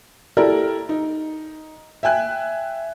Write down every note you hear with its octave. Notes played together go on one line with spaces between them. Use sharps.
E4 G4 A4 A#4 D5
D#4
E5 G5 G#5 F#6